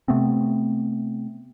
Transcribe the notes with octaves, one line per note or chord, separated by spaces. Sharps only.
C3 A3 B3 C4